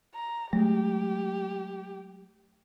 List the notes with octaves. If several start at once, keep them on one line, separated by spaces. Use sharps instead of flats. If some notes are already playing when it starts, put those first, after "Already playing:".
A#5
F#3 G#3 A3 G4